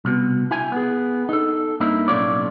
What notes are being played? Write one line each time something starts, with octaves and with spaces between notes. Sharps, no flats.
C2 B2
E4 G5 G#5
B3 G#4
D#4 A4
G2 A#3 C4 D#4 E4
B1 A2 C#4 F4 C#5 D5